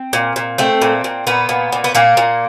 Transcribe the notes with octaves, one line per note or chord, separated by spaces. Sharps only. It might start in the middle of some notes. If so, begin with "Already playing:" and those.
Already playing: C4
A#2
A#2
A3 C4
A#2
A#2
A#2 B3
A#2
A#2
B3
A#2 A#3
A#2